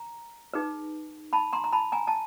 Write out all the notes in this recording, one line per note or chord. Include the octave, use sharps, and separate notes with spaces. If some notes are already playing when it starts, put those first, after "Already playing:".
Already playing: A#5
D#4 G#4 B4
A5 B5
A#5 C6
A#5
A5 B5
G#5 A#5
A5